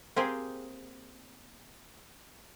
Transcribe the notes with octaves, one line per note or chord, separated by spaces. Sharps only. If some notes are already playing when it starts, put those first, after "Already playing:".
A#3 C4 G4 G#4